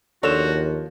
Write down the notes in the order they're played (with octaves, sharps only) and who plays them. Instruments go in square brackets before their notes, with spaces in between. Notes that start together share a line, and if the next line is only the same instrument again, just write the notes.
[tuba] D#2 [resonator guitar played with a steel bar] F3 F4 C#5 [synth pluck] D4 A4 E7 [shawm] F#4